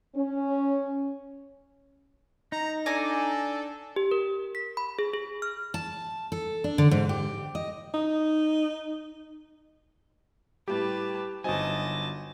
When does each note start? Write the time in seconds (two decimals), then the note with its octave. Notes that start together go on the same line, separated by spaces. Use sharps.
0.15 C#4
2.52 D#4 A#5
2.86 D4 A4 G#5 A#5 D6
3.96 G4
4.11 A#4
4.55 B6
4.77 B5
4.99 G#4
5.14 G#4
5.42 F6
5.74 A5
6.32 A4
6.64 D4
6.78 D3
6.91 G#2
7.09 G4
7.55 D#5
7.94 D#4
10.68 A2 G3 G4 B4 A5
11.44 G1 F#3 C4 D#4 D#5 G#5 A5